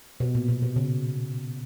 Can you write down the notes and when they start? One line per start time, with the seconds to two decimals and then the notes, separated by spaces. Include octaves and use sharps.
0.20 B2
0.35 A#2
0.48 B2
0.62 B2
0.76 C#3